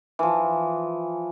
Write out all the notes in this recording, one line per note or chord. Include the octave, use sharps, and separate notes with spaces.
E3 F3